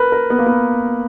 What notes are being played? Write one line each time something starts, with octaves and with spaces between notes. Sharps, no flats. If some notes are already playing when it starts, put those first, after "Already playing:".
Already playing: A#4 B4
A#4
B3
A#3
B3